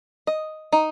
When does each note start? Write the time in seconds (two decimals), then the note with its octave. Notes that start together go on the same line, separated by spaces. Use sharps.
0.27 D#5
0.73 D#4